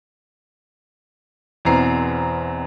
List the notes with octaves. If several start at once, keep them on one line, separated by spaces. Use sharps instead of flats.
E2 B2 C4 E4 A#5 C7